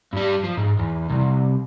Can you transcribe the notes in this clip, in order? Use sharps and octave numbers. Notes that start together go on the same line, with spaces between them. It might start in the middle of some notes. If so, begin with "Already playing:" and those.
G2 G3
F3
G#2
E2
C2